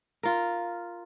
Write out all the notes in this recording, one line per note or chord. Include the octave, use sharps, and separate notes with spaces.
F4 A#4